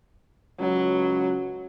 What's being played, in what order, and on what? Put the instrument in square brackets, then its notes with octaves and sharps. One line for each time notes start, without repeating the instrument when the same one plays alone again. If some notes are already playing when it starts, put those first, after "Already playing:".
[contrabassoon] C#2 [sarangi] F#3